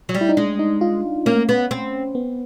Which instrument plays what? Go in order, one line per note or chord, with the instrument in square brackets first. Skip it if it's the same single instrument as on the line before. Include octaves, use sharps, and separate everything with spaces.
[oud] F#3
G3
[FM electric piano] E4
D#4
[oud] G#3 [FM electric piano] D4
[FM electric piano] D#4
F4
[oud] A#3 [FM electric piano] C#4
[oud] B3
C4
[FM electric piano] B3